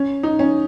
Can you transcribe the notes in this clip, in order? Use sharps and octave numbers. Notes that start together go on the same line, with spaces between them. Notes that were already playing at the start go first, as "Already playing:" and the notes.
Already playing: C#4
D#4
C#4